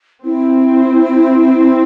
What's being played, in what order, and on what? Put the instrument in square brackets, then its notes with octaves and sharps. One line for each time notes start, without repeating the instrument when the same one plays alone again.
[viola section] C4 [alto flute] E4